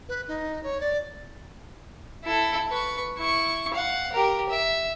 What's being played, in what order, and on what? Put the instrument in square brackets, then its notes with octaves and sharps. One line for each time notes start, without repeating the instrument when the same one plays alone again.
[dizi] B4
D#4
C#5
D5
[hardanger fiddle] E4 A4
B4 C#6
E4 C#6
F5 F#5
G4 A#4
E5